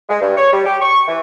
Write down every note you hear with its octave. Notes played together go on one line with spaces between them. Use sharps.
G#3
G2
C#5
G3
G4
C#6
E3